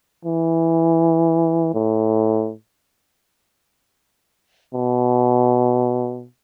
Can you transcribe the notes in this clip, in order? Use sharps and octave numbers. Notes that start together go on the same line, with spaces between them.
E3
A2
B2